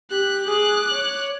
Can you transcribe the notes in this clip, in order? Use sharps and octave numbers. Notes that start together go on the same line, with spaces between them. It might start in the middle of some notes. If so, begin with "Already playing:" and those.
G4 F#6
G#4 D6 F#6
C#5